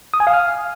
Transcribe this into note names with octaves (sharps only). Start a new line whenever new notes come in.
D#6
G#5
F5
F6